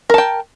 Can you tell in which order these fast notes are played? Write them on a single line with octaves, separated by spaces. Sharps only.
A#4 A5 G5